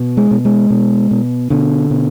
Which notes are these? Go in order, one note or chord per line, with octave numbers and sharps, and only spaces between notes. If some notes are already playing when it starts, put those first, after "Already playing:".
Already playing: B2
G#3
B2
G#3
B2
B2
B2 D3
B2